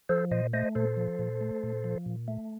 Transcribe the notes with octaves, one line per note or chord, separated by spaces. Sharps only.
F3 A4 C5
A#2 C5 D#5
A3 C5 D#5
A#2 A4 C5
F3
A#2
A3
A#2
F3
A#2
A3